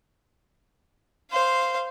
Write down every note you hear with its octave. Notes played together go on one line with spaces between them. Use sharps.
C5 F5